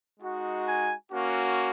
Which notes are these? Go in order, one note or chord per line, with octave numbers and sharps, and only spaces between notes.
G#3 D#4 F#4
G#5
A#3 C#4 F#4